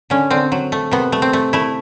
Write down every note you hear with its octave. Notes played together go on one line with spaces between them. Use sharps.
D3 C#4
D3 C4
F#3
A3
C3 B3
A3
C4
A3
A3 E4